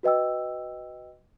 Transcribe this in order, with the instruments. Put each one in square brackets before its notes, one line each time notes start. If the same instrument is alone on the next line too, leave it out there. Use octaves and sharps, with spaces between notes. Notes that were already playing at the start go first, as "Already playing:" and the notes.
[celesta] F#4 B4 D#5 G5 E6